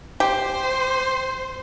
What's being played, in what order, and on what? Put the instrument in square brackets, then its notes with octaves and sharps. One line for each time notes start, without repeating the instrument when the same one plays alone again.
[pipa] G4 [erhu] C5